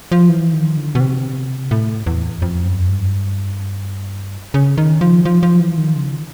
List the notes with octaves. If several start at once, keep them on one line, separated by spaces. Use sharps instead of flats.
F3
E3
D#3
D3
B2
C3
A2
E2
F2
F#2
G2
C#3
D#3
F3
F3
F3
E3
D#3
C#3